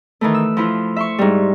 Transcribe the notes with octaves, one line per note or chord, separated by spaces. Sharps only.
D#3 E3 A3
E6
F3 E4 F4
E5 C6 C#6
G#2 G3